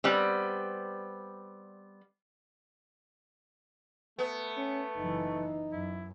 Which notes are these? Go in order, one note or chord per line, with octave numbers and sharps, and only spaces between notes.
G3 B3 C4
A3 B3
C#4
F#1 E3 D#4
F#2 E4